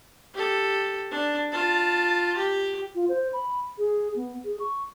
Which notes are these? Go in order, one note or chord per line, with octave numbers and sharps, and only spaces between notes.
G4 A4
D4
F4 A5
G4
F4
C5
B5
G#4
B3
G#4
C#6